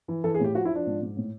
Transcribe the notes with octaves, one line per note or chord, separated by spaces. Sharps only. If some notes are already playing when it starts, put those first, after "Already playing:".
E3
E3 A4
G#4
A2 G4
F3 F#4
E4
F3 D4
G#2
G#2
A2